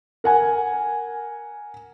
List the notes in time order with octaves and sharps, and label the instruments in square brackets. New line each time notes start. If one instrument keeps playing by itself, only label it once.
[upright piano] A#4 F#5 G#5